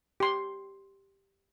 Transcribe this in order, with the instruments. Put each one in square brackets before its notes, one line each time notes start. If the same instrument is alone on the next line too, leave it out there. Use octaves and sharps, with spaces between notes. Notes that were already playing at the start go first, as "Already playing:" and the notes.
[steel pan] G4 C6